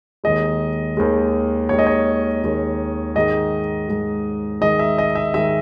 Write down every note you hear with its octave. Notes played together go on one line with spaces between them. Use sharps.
D#2 D#3 G#3 D#5
D#2 D#3 G#3
D#2 D#3 G#3 C#5
D#5
C#5
D#2 D#3 G#3
G#2 D#3 G#3 D#5
G#2 D#3 G#3
G#2 D#3 G#3 D#5
E5
D#5
E5
G#2 D#3 G#3 E5